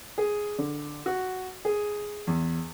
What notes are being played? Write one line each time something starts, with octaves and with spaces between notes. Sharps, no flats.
G#4
D3
F#4
G#4
E2